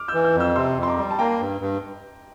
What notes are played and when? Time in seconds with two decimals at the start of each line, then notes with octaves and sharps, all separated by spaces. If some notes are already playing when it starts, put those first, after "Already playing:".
Already playing: D6 F6
0.08 E6 G6
0.14 E3
0.24 E6 G6
0.34 F2
0.40 E6 G6
0.56 C3 C6 E6
0.77 F2
0.83 C6
0.88 A#5 D6
0.98 G3
1.11 A5
1.19 A#3 G5 A#5
1.40 G2
1.61 G2